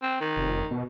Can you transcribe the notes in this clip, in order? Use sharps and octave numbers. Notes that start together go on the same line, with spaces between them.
C4
D#3
F1
B2